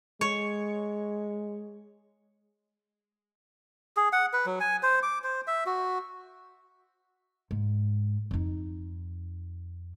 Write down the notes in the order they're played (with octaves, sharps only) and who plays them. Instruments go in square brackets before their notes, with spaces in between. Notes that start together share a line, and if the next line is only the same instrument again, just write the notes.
[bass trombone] G#3 [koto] C#5
[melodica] G#4
F#5
B4
F#3
G#5
C5
D6
C5
E5
F#4
[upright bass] G#2
F2 D#4